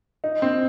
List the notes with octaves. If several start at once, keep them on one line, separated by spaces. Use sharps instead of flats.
D#4
C4